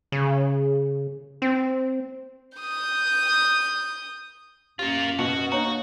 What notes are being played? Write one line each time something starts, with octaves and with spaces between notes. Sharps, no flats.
C#3
C4
D#6 G6
F#2 A#3 F4 G4
B2 F#4
A#3 D4 F#4 C#5 A#5